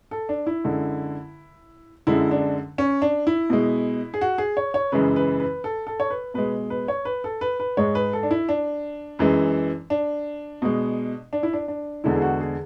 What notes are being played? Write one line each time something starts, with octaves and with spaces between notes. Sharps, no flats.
A4
D4
E4
F#2 D3 G#3
F#2 D3 G#3 E4
D4
C#4
D4
E4
B2 G#3
G#4
F#4
G#4
C#5
C#5
F#2 C#3 E3 G#3 B4
B4
B4
A4
A4
C#5
B4
B2 G#3 B4
B4
C#5
B4
A4
B4
B4
G#2 G#3 C#5
B4
A4
D4
E4
D4
F#2 E3 G#3
D4
B2 G#3
D4
E4
D4
D4
E2 D3 G#3 E4
G#4
F#4
G#4